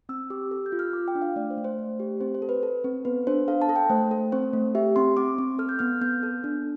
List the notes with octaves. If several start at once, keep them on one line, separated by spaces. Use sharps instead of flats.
C4 E6
G4 D6
A4 E6
G6
F4
F6
F4 D6
G5
D4
F5
A3 D5
C5
A3
C5
A3
G4
C4 C5
C5
A4
B4
A4
C4
B3 B4
D4 C5
A4 F5
A5
A4
G5
A3 C5
A4
C4 C5
A3
G4 E5
C4 C6
C4 D6
C4
A4 F6
G6
B3 F6
B3 G6
A4
D4